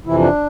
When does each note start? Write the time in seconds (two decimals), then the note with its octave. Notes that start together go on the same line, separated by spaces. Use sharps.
0.06 F2 C3 E3 E4
0.20 D4